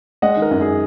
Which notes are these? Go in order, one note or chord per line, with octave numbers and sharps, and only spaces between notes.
G#3 D#5 F#5
D#3
A#4
F#2
G#4